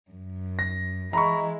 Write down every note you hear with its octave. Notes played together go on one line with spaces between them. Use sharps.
F#2
A#6
E3 G#3 E4 A#5 B5 C#6